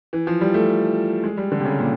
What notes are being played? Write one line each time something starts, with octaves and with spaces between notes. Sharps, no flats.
E3
F3
G3
A3
G#3
G3
D3
C3
C#3
A#2